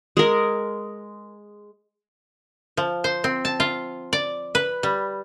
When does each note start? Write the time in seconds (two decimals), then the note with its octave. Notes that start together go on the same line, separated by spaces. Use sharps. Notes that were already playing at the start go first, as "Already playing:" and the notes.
0.17 G#3 A#4
2.77 F3
3.04 C5
3.24 C4
3.45 A5
3.60 F4
4.13 D5
4.55 B4
4.83 G3